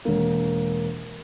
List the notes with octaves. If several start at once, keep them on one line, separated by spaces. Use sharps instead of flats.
E1 A#3